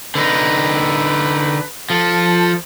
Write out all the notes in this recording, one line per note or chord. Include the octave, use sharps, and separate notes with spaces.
D3 D#4 B4
F3 A4